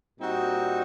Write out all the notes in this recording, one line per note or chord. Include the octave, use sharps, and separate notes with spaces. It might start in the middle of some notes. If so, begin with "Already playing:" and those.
A#2 G3 C4 D#4 F#4